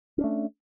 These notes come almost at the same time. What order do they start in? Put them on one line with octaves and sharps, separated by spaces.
C#4 D4 A3